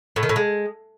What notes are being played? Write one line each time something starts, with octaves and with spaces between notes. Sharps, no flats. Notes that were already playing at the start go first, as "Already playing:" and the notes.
A2
D#3
A2
G#3